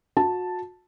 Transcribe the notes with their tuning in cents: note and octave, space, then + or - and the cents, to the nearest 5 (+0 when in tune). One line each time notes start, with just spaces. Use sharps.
F#4 -30 A5 +0